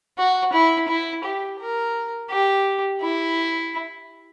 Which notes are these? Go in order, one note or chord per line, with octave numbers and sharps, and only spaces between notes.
F#4
E4
E4
G4
A#4
G4
E4